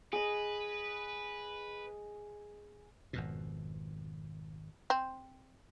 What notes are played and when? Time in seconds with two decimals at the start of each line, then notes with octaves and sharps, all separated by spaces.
0.13 G#4 B4 D#5
3.13 G#1 F2 B2
4.90 C4